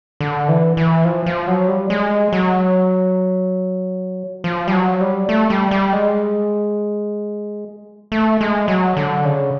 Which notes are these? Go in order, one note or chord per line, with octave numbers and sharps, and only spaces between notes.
D3
E3
E3
F3
F3
F#3
G3
G#3
F#3
F3
G3
F#3
G3
A3
G3
G3
G#3
A3
G#3
F#3
D3
C#3